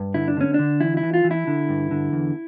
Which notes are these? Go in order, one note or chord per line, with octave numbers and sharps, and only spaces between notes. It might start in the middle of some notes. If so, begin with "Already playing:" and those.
Already playing: G2
D3 E4
D4
D3 C#4
D3 D4
E3 E4
E4
E3
F4
E3
E4
D3
G2
D3
E2